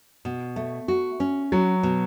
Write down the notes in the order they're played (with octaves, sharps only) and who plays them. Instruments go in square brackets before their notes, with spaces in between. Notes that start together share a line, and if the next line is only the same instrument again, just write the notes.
[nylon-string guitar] B2
A3
F#4
C#4
[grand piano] F#3 [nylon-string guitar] F#4
[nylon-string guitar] B2